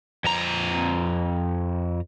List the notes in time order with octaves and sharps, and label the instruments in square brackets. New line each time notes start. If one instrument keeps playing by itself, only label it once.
[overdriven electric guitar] F2 A#5